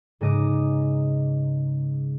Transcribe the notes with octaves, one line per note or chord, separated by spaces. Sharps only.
G#2 C#3 G#3 D#5 A#5 D6